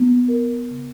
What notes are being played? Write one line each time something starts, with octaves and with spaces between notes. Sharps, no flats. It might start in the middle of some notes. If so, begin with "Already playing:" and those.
Already playing: B3
A#4
C#3